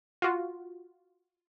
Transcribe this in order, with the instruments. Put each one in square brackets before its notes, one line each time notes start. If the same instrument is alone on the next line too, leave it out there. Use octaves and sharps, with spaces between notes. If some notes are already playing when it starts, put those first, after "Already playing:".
[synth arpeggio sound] F4 F#4